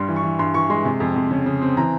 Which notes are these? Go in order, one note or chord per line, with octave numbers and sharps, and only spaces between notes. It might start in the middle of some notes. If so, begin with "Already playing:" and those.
Already playing: G2 G3 C6
E3
C#6
E3
G2 C6
E3 C#6
G#3 C6
C3
F2
F2
C#3
C#3
C4
E3 A#5